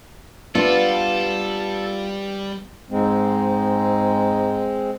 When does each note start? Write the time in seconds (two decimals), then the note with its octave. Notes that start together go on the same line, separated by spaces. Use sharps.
0.55 G3 B3 D4 F4 A4 D5
2.91 G#2 G#3 C4